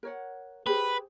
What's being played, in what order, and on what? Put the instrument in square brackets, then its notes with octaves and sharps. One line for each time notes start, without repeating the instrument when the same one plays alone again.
[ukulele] A#4 C#5 F#5
[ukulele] G4 G#4 C5 [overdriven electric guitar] B4